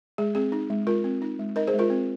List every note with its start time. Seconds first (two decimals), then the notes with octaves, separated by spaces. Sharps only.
0.18 G#3 G#4
0.35 C4 G#4
0.52 D#4
0.70 G#3
0.87 G#3 F4 A#4
1.04 C4
1.22 D#4
1.39 G#3
1.56 D#4 A#4 D#5
1.67 G#4 C5
1.74 G#3
1.79 F4 A#4
1.90 C4